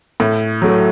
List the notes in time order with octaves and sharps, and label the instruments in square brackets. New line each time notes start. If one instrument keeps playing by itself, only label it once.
[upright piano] A2
F#3 A3